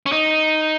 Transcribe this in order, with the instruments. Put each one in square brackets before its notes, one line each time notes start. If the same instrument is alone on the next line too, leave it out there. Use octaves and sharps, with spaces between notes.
[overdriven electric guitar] C#4
D#4